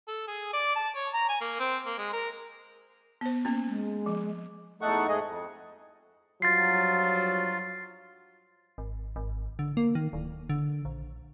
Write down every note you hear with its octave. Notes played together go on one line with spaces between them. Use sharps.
A4
G#4
D5
A5
C#5
A#5
G#5
A#3
C4
A#3
G#3
A#4
B3 C5
A#3 C#4
G#3
F3
E2 A3 D#4 A4 F#5 C#6
G#2 G#3 A3 G#4 D#5
F2
G2 F3 F#3 F4 A6 C7
G#1
G#1
D3
A#3
D#3
D1
D3
A#1